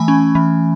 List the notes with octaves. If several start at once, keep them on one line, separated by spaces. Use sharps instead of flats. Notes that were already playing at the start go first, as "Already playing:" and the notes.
Already playing: E3 A3 G#5 B5
C#4
E3